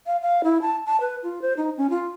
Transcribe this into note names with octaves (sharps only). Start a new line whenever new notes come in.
F5
F5
E4
A5
A5
B4
F4
C5
D#4
C#4
F4